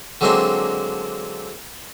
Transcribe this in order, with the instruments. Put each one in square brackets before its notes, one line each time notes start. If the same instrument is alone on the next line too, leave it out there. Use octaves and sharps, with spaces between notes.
[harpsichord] D3 F#3 G#3 A#3 C4 D4